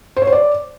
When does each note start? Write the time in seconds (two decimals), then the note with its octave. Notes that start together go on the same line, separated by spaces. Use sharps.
0.16 C5
0.22 C#5
0.27 C5
0.32 D5